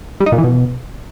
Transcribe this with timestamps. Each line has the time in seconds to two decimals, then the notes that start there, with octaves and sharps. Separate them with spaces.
0.20 G3
0.26 D#4
0.32 A#2
0.38 E3
0.44 B2